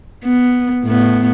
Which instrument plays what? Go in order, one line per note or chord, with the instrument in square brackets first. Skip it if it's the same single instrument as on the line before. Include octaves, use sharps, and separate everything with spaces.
[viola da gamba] B3
A2 B3